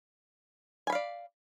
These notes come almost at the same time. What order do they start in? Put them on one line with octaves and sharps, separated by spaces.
G#5 B5 F5 D5